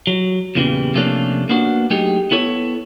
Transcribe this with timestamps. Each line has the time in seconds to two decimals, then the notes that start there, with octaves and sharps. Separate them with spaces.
0.07 F#3
0.55 E2 A#2 C#3 E3 G3
0.94 C3 F3 A3 A#3 C#4 D4
1.49 A#3 B3 D4 F#4
1.90 F#3 A3 D#4 G4 G#4
2.31 B3 E4 A4 C#5